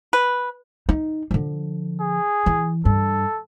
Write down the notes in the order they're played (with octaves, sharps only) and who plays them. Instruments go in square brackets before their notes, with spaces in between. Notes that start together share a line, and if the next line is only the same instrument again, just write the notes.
[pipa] B4
[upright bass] D#4
D3 F3
[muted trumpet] G#4
[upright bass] E3
[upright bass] G2 [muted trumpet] A4